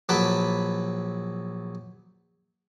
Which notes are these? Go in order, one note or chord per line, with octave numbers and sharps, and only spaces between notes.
A#1 F#3 B4 A5 B5 D6